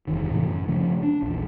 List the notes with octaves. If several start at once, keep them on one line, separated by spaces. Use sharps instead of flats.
F#1 E2 D#3
A2 C3 E3 A3
F#2
C#3 F3 A3 C#4
D4
A#1 E2